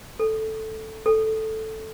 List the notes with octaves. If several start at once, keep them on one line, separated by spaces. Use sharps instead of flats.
A4
A4